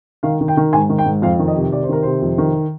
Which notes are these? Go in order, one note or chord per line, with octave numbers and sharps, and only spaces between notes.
D#3 F5
D#3
G5
D#3
G#2 G#5
D#3
G5
G#2
F2 F5
D#3
D#5
C3
C3 D5
C5
D#3 A#4
C3 C5
F2
D#3